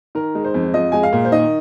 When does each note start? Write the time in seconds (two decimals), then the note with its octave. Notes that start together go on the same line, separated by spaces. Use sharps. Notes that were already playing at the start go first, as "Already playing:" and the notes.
0.15 D#3 A#4
0.35 G#3
0.45 C5
0.54 F2
0.74 F3 D#5
0.92 G#3 G#5
1.03 F5
1.13 A#2
1.25 C5
1.32 D#3 D#5